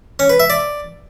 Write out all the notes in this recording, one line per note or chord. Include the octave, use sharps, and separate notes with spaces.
C#4
B4
E5
D5